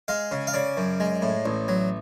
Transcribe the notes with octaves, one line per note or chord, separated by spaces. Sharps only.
G#3 F5
C#3
F5
C#3 D5
F#2
G#3
A2
A1
F#3